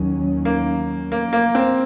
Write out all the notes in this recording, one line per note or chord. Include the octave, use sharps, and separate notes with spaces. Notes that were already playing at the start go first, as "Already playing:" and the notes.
Already playing: D#2 D#3 F#3 C#4
A#3
A#3
A#3
C4